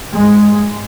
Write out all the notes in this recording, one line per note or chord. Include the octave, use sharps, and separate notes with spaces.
G#2 G#3